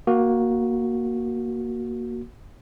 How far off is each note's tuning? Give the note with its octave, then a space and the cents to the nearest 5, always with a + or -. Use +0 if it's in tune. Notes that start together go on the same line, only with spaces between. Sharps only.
A#3 +10 F#4 +0